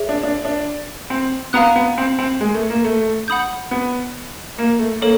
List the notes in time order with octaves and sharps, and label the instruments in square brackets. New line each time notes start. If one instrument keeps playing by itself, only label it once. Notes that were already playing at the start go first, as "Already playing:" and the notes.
Already playing: [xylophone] G#4 C#5 E5
[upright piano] D4
D4
D4
C4
[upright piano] B3 [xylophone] F5 A#5 D#6 F#6
[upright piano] B3
C4
C4
G#3
A3
A#3
A3
[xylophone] F#5 B5 D#6 G6
[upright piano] B3
A#3
A3
[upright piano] A#3 [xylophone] A4 C#5